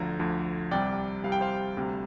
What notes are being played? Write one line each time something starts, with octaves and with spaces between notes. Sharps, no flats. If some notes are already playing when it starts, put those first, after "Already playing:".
Already playing: D2 D3 F3 F5 A#5
D2 D3 F3
C2 C3 G3 D5 G5
C2 C3 G3 F5
G5
C5 F5
D2 C3 G3